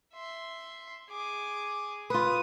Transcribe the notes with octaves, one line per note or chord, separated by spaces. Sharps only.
E5 C6
G#4 D6
F4 B4 D#6